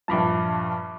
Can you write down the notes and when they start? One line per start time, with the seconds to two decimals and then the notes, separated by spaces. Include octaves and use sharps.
0.08 A#1 G2 F3 A5 B5 D6